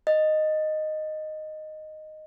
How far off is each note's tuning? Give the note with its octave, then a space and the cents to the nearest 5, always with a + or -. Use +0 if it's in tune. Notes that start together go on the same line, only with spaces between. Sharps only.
D#5 -5